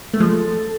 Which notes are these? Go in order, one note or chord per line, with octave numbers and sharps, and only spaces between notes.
A3
F3 G#3 A4